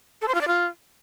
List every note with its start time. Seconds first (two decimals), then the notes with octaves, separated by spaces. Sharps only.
0.21 A4
0.28 C5
0.34 F4
0.41 D5
0.48 F4